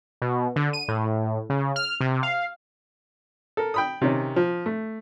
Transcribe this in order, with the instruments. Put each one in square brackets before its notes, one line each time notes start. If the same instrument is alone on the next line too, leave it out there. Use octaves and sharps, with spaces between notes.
[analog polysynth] B2
D3
D#7
A2
C#3
F6
C3
F5
[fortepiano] A4 A#4
G5 B5 D#6
C3 D#3 C#4
F3
A3